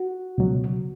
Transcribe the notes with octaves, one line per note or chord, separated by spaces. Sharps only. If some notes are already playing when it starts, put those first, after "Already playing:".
Already playing: F#4
C#2 B2 F#3